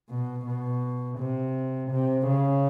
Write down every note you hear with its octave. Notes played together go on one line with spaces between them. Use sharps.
B2
B2
C3
C3
C#3